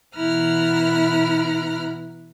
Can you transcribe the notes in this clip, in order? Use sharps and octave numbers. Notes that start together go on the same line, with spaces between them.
B2 E3 E4 A#5 F6 F#6